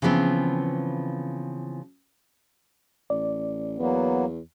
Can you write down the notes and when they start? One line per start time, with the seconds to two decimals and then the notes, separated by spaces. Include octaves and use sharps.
0.02 C#3 E3 F3 B3 C4
3.10 A1 D5
3.79 E2 F#3 A#3 B3